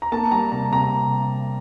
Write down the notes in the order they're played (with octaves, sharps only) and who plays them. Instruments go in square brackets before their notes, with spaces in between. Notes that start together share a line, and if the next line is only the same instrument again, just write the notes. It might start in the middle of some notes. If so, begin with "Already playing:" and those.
[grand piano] A#5
A#3 A5
G3 A#5
C3 A#5
C3 A#5